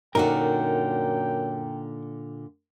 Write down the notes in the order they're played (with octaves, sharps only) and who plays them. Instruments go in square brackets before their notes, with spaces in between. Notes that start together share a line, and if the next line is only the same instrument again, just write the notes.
[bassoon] F#2 [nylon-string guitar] A#2 D3 F#4 [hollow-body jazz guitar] D#4 A#4 [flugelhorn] G5